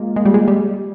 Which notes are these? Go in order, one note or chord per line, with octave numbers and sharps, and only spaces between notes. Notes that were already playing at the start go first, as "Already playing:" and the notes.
Already playing: G#3 A#3 F4
G#3
G3
G#3
G3